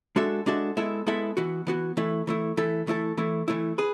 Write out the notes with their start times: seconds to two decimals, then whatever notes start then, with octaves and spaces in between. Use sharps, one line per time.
0.16 G#3 D4 F#4 A4 E5
0.46 G#3 D4 F#4 A4 E5
0.77 G#3 B3 E4 A4 E5
1.07 G#3 B3 E4 A4 E5
1.37 E3 B3 F#4
1.67 E3 B3 F#4
1.97 E3 A3 E4
2.27 E3 A3 E4
2.57 E3 A3 E4 A4
2.87 E3 A3 E4 A4
3.17 E3 A3 E4
3.48 E3 A3 E4
3.78 G#4 B4